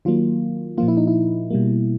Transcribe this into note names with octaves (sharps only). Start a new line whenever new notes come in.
D#3 F#3 A#3 F4
A#2 F3 A#3 F4
E4
D#4
E4
B2 G3 A#3